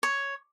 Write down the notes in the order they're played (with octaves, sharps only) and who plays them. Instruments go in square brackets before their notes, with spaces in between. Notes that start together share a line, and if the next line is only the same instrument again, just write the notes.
[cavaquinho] C#5